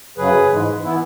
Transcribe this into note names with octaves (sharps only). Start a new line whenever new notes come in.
F#2 C#3 F#3 G#4 B4
G#2 E3 G#3
E3 B3 E4